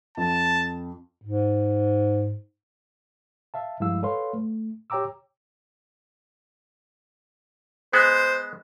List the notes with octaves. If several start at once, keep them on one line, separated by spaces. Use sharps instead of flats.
F2 A5
G#2
E5 F5 A5
G2 F3 G#3 E4 F5 E6
A4 B4 C#5 F5 C6
A3
G4 C#5 G5 A#5 D6 E6
G#3 B3 C5